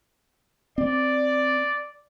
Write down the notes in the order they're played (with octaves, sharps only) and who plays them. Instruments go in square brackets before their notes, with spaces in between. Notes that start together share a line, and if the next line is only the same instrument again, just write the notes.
[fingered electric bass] C4 [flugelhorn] D5